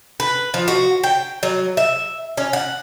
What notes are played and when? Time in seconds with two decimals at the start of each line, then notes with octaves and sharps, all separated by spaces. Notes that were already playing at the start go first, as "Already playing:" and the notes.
0.20 B4
0.54 F3
0.68 F#4
1.03 G5
1.43 F#3
1.77 E5
2.37 C#4
2.53 F#5